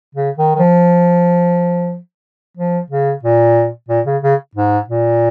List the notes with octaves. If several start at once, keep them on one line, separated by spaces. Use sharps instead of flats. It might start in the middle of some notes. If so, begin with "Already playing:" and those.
C#3
D#3
D#3
F3
F3
C#3
A#2
A#2
C#3
C#3
G#2
A#2